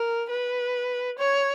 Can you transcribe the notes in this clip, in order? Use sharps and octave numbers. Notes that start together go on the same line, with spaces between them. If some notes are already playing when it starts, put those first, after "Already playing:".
Already playing: A#4
B4
C#5